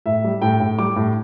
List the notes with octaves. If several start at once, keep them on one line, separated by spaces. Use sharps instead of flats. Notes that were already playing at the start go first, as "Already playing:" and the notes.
A2 E5
G3
A2 G5
A2
G3 D6
A2